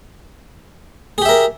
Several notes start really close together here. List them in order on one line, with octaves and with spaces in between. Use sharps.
G#4 G4 E5 A#4